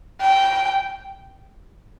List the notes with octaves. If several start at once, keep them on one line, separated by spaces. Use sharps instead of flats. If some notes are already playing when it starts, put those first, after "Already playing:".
G5